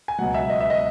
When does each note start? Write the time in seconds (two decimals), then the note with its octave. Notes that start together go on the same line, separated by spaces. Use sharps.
0.08 G#5
0.19 C#2 B2 F#3 F#5
0.34 E5
0.50 D#5
0.60 E5
0.70 D#5